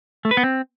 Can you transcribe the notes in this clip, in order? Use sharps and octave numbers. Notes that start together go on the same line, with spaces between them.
A3
B4
B3
C4